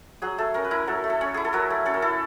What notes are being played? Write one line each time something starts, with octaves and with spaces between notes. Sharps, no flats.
F#3 G#4
A3 A4
C#4 A#4
B4
E4 A#4
F#3 A4
A3
A4
C#4
E4 G#4
A4
F#3 A#4
A3
C#4 A4
A#4
E4 A4